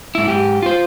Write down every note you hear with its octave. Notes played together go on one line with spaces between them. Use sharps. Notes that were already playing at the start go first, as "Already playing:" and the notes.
G#2 E4
G#2 G4
F4 C5